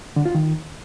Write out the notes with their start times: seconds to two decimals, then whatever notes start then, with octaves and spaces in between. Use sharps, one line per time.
0.16 D3
0.26 F4
0.35 D#3